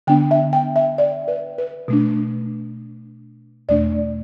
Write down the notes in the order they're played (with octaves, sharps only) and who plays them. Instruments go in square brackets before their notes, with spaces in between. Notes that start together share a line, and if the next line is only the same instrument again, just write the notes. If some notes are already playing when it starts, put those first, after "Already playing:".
[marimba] D3 B3 D4 G5
E5
G5
E5
D5
B4
B4
B2 A3 D4
E2 B2 A3 D4 D5